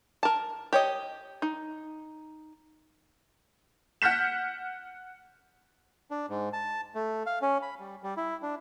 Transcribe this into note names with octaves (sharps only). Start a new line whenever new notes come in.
A#4 A5
G4 C#5 D#5
D#4
F#5 F6 G6 B6 E7
D4
G#2
A5
A3
F5
C#4
B5
G3
G3
E4
D4